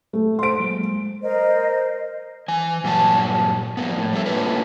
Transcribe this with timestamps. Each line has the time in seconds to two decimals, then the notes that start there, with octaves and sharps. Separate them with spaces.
0.13 A3
0.39 A3 C5 C6 D7
0.60 F#3 G#3 A#3
1.21 A#4 C5 D#5
2.48 E3 G#5
2.84 G2 A#2 F#3 F#4 G#4 A5
3.77 F3 G3 A#3 B3
3.98 A2
4.13 G3 A#3 A4 E5
4.26 A3 A#3 C#4 D4 F4 B4